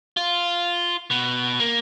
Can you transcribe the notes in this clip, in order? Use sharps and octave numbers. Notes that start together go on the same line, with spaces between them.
F4
B2
A#3